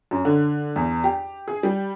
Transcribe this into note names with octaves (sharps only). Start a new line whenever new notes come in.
F#2
D3
E2
G4
G#4
G3